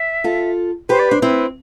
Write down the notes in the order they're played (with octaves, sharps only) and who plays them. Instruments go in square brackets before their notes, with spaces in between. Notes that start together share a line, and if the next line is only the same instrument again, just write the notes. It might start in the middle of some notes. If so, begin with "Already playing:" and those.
Already playing: [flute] E5
[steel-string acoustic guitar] F4 A4
[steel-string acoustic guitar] G4 B4 [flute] C5
[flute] D5
[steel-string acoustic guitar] D4 [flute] C5
[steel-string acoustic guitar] C4 E4 [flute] B4